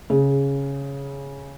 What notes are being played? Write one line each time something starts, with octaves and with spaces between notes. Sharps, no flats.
C#3